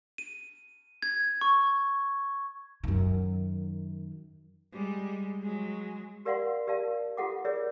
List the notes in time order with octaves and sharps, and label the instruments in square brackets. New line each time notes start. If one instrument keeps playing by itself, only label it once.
[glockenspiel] D#7
G#6
C#6
[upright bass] F#2 D#3
[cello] G3 G#3
F#3 G#3
[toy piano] G4 A#4 D5 F5 F#5 C6
G4 A#4 D5 F5 A5
F4 G4 A4 F#5 D6
G#4 A#4 C#5 D5 E5